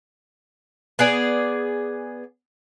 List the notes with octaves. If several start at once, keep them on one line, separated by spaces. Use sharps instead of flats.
B3 G#4 D5